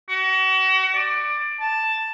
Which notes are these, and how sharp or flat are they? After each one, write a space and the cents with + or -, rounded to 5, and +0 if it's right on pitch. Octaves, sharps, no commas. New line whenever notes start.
F#4 +35
D5 +15
A5 +5